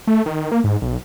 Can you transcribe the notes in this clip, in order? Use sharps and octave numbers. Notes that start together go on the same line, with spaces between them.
A3
D#3
A#3
G#2
B1